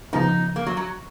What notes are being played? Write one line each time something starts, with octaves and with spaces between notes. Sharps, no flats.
C#3 F3 B3 D#4
A#3
F#3
F#3